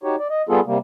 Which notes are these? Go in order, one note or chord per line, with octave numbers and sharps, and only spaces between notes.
D#4 F#4 G4 C#5
D5
D#5
G3 B3 F4 G#4 A4
C3 G3 A#3